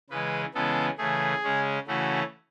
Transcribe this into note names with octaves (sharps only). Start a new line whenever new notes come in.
C#3 E3 G#3 B4
C#3 E3 G#3 B3 A4
C#3 E3 A3 G#4
C#3 G#3 C#4
C#3 E3 A3 C#4 F#4